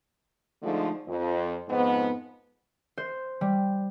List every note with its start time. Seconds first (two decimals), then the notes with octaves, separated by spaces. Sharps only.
0.63 D3 F3 G#3 A3 D#4
1.08 F2
1.68 F2 G#2 B3
2.98 C5
3.41 G3